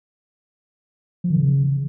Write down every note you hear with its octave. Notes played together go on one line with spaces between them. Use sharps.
F3
D#3
C#3